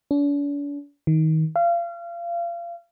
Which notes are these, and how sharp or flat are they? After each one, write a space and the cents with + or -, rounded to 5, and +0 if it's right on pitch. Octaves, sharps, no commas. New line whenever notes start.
D4 -45
D#3 +25
F5 -30